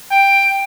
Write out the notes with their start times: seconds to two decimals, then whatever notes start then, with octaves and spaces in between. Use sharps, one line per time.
0.11 G5